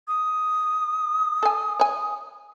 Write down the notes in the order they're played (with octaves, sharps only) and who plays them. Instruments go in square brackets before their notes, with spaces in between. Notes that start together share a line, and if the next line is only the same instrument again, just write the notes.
[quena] D#6
[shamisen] A4 G#5
C#5 G#5